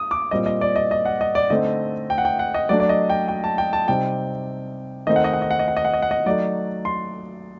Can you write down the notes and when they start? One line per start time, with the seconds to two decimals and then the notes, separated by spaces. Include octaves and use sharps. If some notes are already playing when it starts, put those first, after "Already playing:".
Already playing: D#6
0.11 D6
0.31 A#2 G3 C4 D#5
0.46 D#5
0.61 D5
0.76 D#5
0.91 D#5
1.05 F#5
1.21 D#5
1.35 D5
1.50 D3 A3 C4 D#4 D#5
2.10 G5
2.18 F#5
2.25 G5
2.39 F#5
2.54 D#5
2.69 F#3 A3 D4 D5
2.80 D5
2.89 D#5
3.10 G5
3.28 G5
3.44 A5
3.58 G5
3.73 A5
3.88 C3 G3 C4 D#4 G5
5.07 D#3 A3 C4 D#4 D#5
5.16 F#5
5.24 D#5
5.33 F#5
5.42 D#5
5.50 F#5
5.59 D#5
5.68 F#5
5.77 D#5
5.85 F#5
5.94 D#5
6.02 F#5
6.11 D#5
6.26 F#3 A3 D#4 D5
6.85 C6